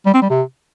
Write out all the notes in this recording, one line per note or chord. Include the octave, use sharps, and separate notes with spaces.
G3
C4
G3
C3